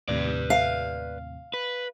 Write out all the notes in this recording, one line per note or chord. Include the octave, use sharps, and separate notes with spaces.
D#2 A2 C3 B4 D5
F5
B4